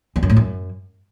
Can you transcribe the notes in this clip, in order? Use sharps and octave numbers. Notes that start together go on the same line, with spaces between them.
E2
F#2
A2
F#2